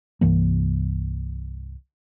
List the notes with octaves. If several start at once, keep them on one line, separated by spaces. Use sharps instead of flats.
C2 G2 E3 A#3